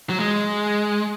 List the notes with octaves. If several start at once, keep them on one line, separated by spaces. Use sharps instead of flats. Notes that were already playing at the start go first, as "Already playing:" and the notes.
F#3
G#3